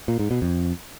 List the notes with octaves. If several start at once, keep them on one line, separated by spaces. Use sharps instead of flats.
A#2
G#2
B2
F2